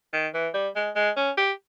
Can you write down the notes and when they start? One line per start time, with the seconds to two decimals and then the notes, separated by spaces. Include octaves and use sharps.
0.13 D#3
0.34 E3
0.54 G3
0.76 G#3
0.96 G#3
1.17 C#4
1.38 G4